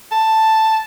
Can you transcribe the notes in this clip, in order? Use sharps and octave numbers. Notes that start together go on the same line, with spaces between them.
A5